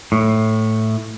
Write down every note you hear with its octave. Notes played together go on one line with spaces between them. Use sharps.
A2